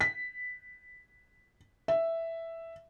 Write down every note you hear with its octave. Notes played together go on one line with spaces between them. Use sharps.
B6
E5